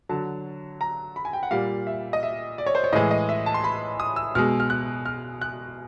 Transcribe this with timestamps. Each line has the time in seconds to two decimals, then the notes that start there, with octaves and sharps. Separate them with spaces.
0.09 D3 F#3 A5
0.81 A#5
1.16 B5
1.25 G#5
1.33 G5
1.43 F#5
1.51 A#2 G3 F5
1.87 E5
2.13 D#5
2.23 E5
2.58 D5
2.67 C#5
2.75 C5
2.84 C#5
2.93 A2 E3 G#3 D#5
3.11 D#5
3.29 E5
3.46 A5
3.54 C6
3.64 B5
4.00 D#6
4.16 E6
4.35 B2 G#3 F6
4.60 F6
4.70 F#6
5.05 F6
5.41 F#6